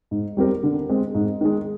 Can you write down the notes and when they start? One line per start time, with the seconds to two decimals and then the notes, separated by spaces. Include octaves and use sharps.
0.11 G#2
0.37 G3 C4 G4 A#4
0.63 D3
0.89 G#3 C4
1.15 G#2
1.41 D#3 G#3